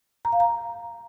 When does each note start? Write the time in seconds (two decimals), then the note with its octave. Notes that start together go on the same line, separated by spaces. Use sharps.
0.25 A#5
0.32 F5
0.40 A#5